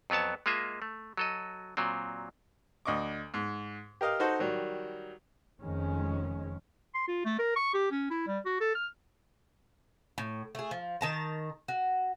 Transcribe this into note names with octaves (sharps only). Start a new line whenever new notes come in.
F2 F#3 B3 C#5 A5
G#3 A#3 F4 D#5 E5
A3
F#3 A4 D#5
A#2 F#3 C4
D2 D#5 C#6 D6
G#2
G4 A#4 D#5 F5
D#4 F#4 A4 C5
D#3 F#3 G3
F1 F2 D#3 G#3 C#4
C6
F4
A3
A#4
C#6
G4
C#4
E4
G3
F#4
A4
F6
A2
A3 G#4
F3
D#3 A5 A#5
F#4